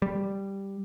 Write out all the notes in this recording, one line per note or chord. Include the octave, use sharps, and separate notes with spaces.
G3